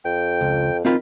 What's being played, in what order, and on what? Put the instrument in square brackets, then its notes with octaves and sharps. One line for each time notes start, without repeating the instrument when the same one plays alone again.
[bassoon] F2 [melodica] G5
[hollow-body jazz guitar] C#2
[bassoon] D#3 [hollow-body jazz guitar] C4 F4 B5